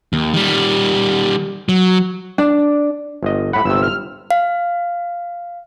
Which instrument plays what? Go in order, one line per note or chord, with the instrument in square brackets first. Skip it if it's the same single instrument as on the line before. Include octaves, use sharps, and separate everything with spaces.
[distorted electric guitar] D#2
D#3 G3
F#3
[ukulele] D4
[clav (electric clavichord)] G1 D#5
[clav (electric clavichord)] A2 F#5 [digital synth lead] B5
[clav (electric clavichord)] G1 C3 [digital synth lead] E6
[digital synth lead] F6
[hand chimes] F5